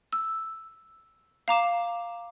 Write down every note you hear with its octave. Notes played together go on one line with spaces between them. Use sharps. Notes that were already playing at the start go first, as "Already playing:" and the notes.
E6
F5 A#5 D6 E7